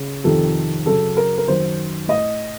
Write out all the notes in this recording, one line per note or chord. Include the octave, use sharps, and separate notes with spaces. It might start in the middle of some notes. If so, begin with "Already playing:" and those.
Already playing: C#3
F2 C3 D#3 A4
F#2 C#3 A4
A#4
A#4
F#2 D#3 C5
A2 D#5